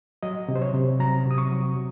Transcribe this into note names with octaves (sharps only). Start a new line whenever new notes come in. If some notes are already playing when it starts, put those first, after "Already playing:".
F#3 D#5
C3
C5
C#5
C3
F#3 A#5
C3
D#6
C#6
F#3